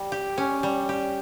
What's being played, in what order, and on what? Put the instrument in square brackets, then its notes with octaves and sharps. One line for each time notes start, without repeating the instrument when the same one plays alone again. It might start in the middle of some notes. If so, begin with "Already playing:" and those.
Already playing: [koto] G3
G4
C#4
G3
G4